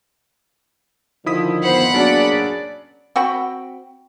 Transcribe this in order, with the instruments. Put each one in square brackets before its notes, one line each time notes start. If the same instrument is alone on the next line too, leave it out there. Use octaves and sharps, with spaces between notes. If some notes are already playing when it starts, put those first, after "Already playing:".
[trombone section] D3 D#3 F3 [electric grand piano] E4 D#6 B6
[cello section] B3 C5 [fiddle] F#5 B5
[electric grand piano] F#3 C#4 D4 [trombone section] A#3 G#4 [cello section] D5
[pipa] C4 F#4 G5 B5